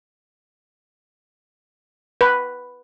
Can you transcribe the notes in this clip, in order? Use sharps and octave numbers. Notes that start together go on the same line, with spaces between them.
B4